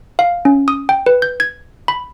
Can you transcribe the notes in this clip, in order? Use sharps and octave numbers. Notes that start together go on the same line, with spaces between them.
F5
C#4
D#6
G5
B4
G6
G#6
B5